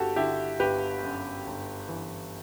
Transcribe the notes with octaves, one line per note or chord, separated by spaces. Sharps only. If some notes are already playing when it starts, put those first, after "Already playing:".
Already playing: G1 F#4 G4 A4
D3 E4 G4
G1 G4 B4
F#2
G1
E3